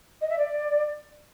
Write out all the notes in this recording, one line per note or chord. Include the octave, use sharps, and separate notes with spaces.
D#5
E5
D5